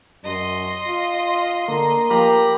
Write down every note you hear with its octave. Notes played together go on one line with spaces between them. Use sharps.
F#2 D#5 C6
F4
D3 A#3
F3 A#3 G4 A#5 B5